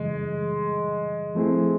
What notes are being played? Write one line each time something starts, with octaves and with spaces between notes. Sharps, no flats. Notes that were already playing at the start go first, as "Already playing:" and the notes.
Already playing: F#2 C#3 E3 G3 G#3
F3 A3 C4 E4 G#4